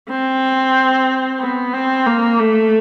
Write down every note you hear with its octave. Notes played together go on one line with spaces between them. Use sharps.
C4
B3
C4
A#3
A3